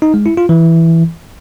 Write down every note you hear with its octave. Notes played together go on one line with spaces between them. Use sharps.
D#4
G#3
E4
F4
E3